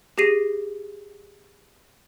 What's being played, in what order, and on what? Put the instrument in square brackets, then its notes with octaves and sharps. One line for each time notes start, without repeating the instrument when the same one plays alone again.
[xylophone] G4 G#4 A#6 C7 D#7